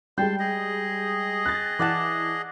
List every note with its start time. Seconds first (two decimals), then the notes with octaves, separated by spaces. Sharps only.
0.18 G3 G#3 G5 A5 C6
0.39 G#4 D#5
1.45 F#6 A6
1.79 E3 D5 F#5 A5